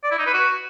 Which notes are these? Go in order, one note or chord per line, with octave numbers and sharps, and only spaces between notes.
D5
E4
D#4
B4
F#4